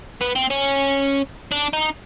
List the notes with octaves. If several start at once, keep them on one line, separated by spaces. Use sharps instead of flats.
B3
C4
C#4
D4
D#4